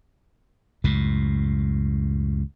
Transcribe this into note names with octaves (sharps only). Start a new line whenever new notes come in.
C#2 F#2 A2